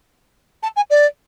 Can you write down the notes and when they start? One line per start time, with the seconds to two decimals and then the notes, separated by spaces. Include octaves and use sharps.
0.63 A5
0.76 G#5
0.90 D5